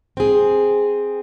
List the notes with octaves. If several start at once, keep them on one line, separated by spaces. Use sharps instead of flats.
C4 G#4